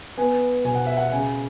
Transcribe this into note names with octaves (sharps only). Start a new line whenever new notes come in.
B3 G#5
B2 G#5
F#5
E5
F#5
C#3 G#5